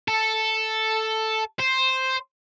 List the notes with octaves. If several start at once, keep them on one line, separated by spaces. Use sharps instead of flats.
A4
C5